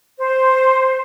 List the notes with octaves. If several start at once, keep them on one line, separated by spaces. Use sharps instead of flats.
C5